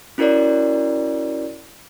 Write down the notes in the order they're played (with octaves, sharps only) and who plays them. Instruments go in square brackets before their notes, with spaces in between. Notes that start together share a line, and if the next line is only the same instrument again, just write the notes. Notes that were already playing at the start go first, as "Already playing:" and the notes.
[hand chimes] C#4 E4 F#4 A#4 C#5 D5